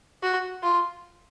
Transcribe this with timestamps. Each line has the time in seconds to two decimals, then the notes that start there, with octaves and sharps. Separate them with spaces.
0.23 F#4
0.63 F4